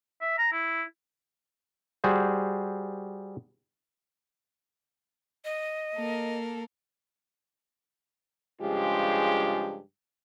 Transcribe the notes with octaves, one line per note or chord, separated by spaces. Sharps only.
E5
A#5
E4
G3 F#4 G#4 C5
D#5
A#3 A4 A#4
G2 C#3 F3 G#3 F4 G4